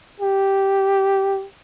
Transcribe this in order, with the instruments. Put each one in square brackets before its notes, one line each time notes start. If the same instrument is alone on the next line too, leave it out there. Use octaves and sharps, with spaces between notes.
[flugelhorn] G4